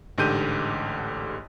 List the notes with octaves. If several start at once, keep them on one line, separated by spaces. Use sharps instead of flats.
A1 G#2 D3 G4 G6 D#7